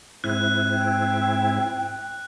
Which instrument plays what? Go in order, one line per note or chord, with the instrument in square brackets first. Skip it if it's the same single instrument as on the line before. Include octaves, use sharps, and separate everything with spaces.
[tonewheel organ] G#2 C4 E4 [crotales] F#6
[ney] G5